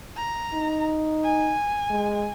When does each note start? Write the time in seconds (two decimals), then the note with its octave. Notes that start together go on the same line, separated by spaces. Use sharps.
0.17 A#5
0.54 D#4
1.24 G#5
1.90 G#3